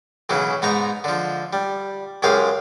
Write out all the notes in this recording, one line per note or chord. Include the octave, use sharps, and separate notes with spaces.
B1 C#3 E3 F#3
G#2 B3 D#4 A#5
D3 F3
G3
C#2 F#2 G#3 G4 F5